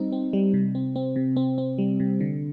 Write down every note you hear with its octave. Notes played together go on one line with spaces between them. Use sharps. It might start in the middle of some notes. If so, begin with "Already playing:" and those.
Already playing: G3 C4 D#4
C4
G3
C3
C4
C4
C3
C4
C4
G3
C3
D3